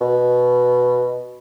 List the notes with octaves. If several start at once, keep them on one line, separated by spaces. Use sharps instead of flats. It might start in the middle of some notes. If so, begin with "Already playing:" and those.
B2